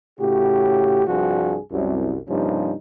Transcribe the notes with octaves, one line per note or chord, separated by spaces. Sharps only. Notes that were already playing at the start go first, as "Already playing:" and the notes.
A2 C#3 F#4 G4
C2 G2 F3 G3 F#4 G#4
C2 F#2
G2 C3 F3 A#3 C#4 D#4